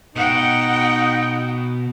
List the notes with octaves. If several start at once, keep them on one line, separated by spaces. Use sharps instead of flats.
B2 D#4 F#5 G5